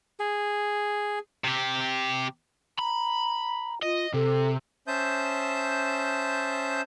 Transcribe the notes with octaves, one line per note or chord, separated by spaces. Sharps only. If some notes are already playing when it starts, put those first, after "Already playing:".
G#4
C3 G4
A#5 B5
F4 D#5
C3 A4
C#4 C5 E5 A5 D#6 G6